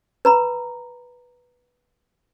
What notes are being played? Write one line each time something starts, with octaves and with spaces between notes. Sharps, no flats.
B4 A#5 B5